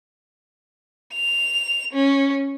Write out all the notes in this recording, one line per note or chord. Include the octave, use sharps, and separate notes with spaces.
F7
C#4